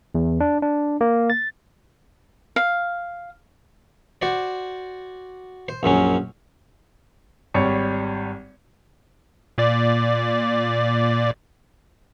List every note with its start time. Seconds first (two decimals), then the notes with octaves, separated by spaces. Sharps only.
0.15 E2
0.40 D4
0.62 D4
1.01 A#3
1.30 A6
2.56 F5
4.22 F#4 C5 D5
5.68 C5
5.83 A#1 F#2 F#3 C#4
7.54 G#1 G3 C#5 C#7
9.58 A#2 D5